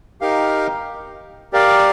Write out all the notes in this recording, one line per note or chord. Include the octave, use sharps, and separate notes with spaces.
D#4 G4 A#4 F5
G4 A#4 D5 F5